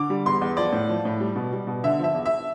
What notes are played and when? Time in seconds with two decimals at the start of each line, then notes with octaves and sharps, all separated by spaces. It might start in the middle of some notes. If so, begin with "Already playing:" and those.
Already playing: D3 D6
0.10 G3
0.26 E2 C6
0.41 E2
0.57 F3 D5
0.72 A2
0.89 F3
1.05 A2
1.20 G3
1.36 B2
1.52 G3
1.67 B2
1.84 D3 E5
1.99 F3 E5
2.14 E2
2.26 E5